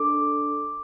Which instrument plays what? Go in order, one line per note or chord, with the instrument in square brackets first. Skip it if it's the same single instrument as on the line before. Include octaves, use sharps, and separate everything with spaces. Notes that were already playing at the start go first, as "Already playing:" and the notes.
Already playing: [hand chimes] D4 A4 D6